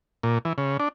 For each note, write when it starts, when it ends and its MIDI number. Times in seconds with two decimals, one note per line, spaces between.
0.23 0.38 46
0.45 0.53 52
0.58 0.77 49
0.80 0.89 62